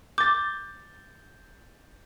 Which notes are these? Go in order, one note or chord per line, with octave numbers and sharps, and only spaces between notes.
D6 G6 A6